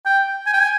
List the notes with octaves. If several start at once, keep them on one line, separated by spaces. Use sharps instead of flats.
G5
G#5
G5
G#5